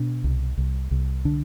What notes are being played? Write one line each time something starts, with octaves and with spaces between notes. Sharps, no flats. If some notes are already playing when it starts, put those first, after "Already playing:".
Already playing: B2 D4
C2
C2
C2
D3 D4